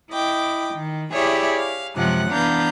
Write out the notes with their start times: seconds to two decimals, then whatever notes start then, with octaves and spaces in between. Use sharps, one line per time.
0.12 E4 D#5 G5 D6
0.75 D#3
1.11 E4 G4 G#4 C#5 D5 E5
1.56 F5
1.97 F#2 C3 F3 G#3 F#5 F#6
2.31 E3 B3 D4 F5 A#5 G6